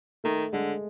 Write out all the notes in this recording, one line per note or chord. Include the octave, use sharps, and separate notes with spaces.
D#3 A3
D3 G#3